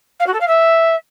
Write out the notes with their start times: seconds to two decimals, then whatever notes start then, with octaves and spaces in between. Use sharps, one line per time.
0.20 F5
0.26 F#4
0.33 A4
0.40 F5
0.47 E5